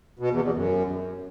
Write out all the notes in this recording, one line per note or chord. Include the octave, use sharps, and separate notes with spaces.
B2
E2
E2
F#2